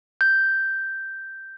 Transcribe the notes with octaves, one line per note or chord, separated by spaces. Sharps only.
G6